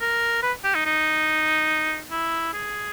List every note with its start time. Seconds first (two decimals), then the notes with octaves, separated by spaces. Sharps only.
0.01 A#4
0.43 B4
0.64 G4
0.75 D#4
0.86 D#4
2.11 E4
2.54 G#4